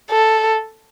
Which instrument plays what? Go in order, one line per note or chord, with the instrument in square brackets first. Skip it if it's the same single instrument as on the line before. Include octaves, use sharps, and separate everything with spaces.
[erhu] A4